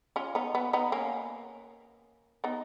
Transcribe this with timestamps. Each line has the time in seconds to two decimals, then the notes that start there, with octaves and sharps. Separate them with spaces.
0.16 C#4 F4
0.35 B3 D#4
0.55 B3
0.73 B3 D#4
0.92 A#3 C#4
2.44 B3 D#4